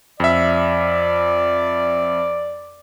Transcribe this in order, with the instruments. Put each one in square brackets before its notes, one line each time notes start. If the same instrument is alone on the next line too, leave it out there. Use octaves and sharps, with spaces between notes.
[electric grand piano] F2 E5 [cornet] D5